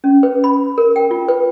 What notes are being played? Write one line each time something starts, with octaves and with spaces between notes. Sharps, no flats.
C#4
B4
B5
A#4
G5
F4
B4